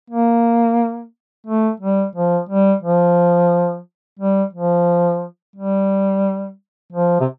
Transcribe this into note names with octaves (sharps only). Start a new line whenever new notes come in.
A#3
A3
G3
F3
G3
F3
G3
F3
G3
F3
C3